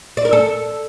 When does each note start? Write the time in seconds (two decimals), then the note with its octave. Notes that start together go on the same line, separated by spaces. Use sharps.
0.17 D5
0.25 A#4
0.33 A4